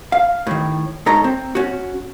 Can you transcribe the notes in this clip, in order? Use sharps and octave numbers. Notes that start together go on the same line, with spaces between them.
F5
A2 D#3
G#2 D#4 A4 C#5 A#5
C4
C#4 F#4